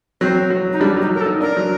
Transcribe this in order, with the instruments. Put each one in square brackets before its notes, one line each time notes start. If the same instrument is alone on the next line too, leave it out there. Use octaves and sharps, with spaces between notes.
[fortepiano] F#3 [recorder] C4
[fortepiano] F#3
[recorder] D#4
[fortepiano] G3 [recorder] D4
[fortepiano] F#3
[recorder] D#4
A#4
A4
[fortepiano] D#4
[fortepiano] D4 [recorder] A#4
[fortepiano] F#3